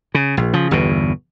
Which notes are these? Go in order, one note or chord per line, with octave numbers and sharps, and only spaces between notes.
C#3
A#1
C#3 F3
G1 E2 B2